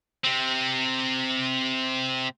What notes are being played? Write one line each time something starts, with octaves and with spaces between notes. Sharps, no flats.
C3 C4